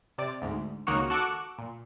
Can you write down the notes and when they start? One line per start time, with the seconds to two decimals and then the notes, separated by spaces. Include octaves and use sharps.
0.18 C3 D5 D7
0.42 D2 G#2
0.87 C#2 D#3 A#3 D#4 F#4 C#5
1.10 F#4 A4 F#5 C#6 D6
1.58 A#2